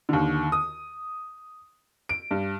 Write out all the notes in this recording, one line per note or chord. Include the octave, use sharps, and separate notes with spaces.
D#2 D3
D#6
D7
G2